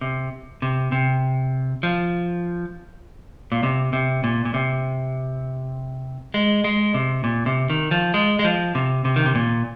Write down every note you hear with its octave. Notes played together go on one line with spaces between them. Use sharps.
C3
C3
C3
F3
A#2
C3
C3
A#2
A#2
C3
G#3
G#3
C3
A#2
C3
D#3
F3
G#3
G#3
F3
C3
C3
D#3
C3
A#2